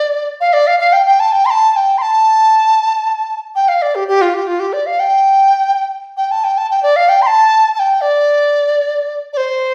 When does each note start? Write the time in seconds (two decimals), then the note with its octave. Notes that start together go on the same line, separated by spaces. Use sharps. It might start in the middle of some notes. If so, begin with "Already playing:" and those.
Already playing: D5
0.40 F5
0.53 D5
0.67 F5
0.80 F5
0.93 G5
1.06 G5
1.20 A5
1.32 G5
1.45 C6
1.50 A5
1.72 A5
1.76 G5
1.98 C6
2.02 A5
3.55 G5
3.68 F5
3.82 D5
3.95 G4
4.08 G4
4.21 F4
4.34 G4
4.47 F4
4.59 G4
4.73 D5
4.86 F5
4.99 G5
6.17 G5
6.31 A5
6.44 G5
6.57 A5
6.70 G5
6.83 D5
6.96 F5
7.09 G5
7.22 C6
7.26 A5
7.75 A5
7.79 G5
8.01 D5
9.33 D5
9.37 C5